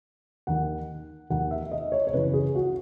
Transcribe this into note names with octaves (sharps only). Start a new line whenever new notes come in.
D#2 D#3 F#5
D#2 D#3 F#5
E5
D#5
C#5
C#5
F#1 F#2 C#3 E3 B4
G#4
F#4